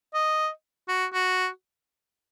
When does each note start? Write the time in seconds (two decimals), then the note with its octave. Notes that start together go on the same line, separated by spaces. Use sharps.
0.14 D#5
0.88 F#4
1.13 F#4